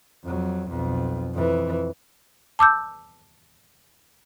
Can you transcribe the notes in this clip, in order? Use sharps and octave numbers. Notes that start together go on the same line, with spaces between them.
F2 F#3
B1 F2
F2 E3
A5 D6 E6 G6